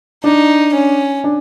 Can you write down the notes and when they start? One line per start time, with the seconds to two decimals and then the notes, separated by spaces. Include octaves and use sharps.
0.24 D4 D#4
0.74 C#4
1.24 D4